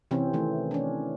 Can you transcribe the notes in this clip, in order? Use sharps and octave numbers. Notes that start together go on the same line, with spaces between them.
C3 E3 C4 C#4
D#3 E3 A3
C#4 D4